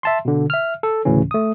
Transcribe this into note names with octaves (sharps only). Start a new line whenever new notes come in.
E5 A5 C6
B2 D3
E5 F6
A4
D2 A2 C#3 E3 C#4
A3 D#6